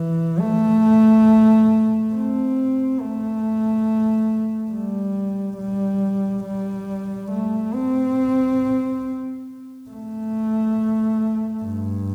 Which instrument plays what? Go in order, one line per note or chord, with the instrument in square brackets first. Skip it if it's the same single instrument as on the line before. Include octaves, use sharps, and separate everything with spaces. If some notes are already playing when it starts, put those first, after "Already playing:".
Already playing: [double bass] E3
A3
C4
A3
G3
G3
G3
A3
C4
A3
G2